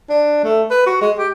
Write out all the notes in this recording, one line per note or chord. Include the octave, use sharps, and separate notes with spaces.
D4
A3
B4
F#4
G#3
G4